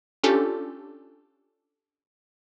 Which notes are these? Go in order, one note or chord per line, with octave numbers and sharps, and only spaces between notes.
C#4 D4 F4 G4 A4